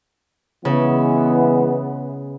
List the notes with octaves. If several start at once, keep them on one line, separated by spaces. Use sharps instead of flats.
C#3 E3 G#3 B3